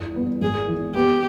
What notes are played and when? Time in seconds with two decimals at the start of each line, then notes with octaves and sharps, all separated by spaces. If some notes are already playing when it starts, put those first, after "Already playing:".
Already playing: G1 E2 E3
0.16 B3
0.41 G#1 G#4
0.68 E3
0.95 B3 G4